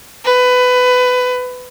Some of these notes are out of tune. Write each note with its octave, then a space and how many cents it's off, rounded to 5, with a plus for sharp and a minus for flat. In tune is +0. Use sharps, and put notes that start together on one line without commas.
B4 +20